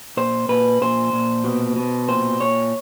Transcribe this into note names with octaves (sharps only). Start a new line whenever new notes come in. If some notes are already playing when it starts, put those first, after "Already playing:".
A#2 C5
A#2 B4
A#2 C5
A#2
B2
B2
A#2 C5
A#2 C#5